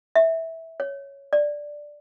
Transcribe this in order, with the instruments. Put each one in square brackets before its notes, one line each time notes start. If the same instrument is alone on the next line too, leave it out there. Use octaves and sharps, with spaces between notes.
[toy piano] E5
C#5
D5